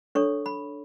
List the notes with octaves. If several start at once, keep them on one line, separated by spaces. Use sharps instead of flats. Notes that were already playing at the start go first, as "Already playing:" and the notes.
D4 A4 C#5 C#6
B5